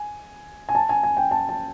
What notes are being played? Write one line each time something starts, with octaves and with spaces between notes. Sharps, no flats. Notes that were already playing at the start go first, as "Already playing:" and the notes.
Already playing: G#5
G#5
A5
G#5
G#5
G5
A5
A5